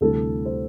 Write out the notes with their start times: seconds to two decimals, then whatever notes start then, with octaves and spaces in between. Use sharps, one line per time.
0.01 D2 C3 E3 G3 A4
0.45 C5